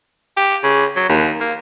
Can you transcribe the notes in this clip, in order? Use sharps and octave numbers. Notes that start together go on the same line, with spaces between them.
G4
C#3
F#3
D#2
A#3